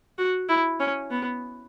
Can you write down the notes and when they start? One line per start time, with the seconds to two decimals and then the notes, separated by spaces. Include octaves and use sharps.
0.18 F#4
0.49 E4
0.80 C#4
1.10 B3